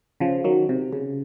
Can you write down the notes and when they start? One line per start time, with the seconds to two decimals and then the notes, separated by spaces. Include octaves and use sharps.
0.20 C#3 F3
0.44 D#3 F#3
0.69 C3
0.93 C#3